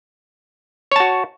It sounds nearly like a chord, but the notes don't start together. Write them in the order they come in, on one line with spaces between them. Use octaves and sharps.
C#5 A5 F#4